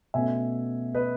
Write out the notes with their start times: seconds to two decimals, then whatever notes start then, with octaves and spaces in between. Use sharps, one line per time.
0.14 B2 A3 C#4 E5 G#5
0.94 B4 D#5